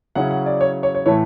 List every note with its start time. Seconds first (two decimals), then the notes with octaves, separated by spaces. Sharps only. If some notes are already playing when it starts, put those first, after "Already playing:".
0.15 C#3 F#3 C#4 E4 F#5
0.31 F#5
0.46 D5
0.61 C#5
0.83 C#5
0.95 C#5
1.06 A2 E3 A3 C#5